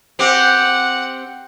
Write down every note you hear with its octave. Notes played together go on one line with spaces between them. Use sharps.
C4 G4 F#5